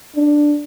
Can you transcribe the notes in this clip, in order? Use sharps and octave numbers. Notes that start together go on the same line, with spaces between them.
D4